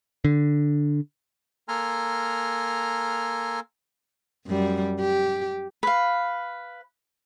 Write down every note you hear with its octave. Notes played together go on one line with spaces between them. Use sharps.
D3
A#3 A4 G#5 A#5 C6 F6
F#2 G3
G4
B4 F5